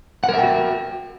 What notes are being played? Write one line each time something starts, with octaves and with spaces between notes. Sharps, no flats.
F#4 A#4 E5 F#5 G5